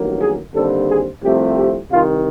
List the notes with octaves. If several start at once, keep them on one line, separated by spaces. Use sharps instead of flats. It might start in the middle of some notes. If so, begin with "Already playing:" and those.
Already playing: A1 G2 D#3 F#3 A#3
G#4
D#2 D3 G3 C4 A4
G#4
C2 C3 F3 A3 C4 G4
G4
C2 C3 D#3 F4